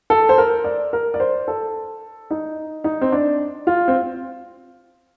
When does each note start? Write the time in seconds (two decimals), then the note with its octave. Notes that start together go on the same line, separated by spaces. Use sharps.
0.10 A4
0.29 C5
0.38 A#4
0.64 D5
0.93 A#4
1.14 D5
1.20 C5
1.48 A4
2.30 D#4
2.84 D#4
3.01 C4
3.12 D4
3.67 F4
3.88 C4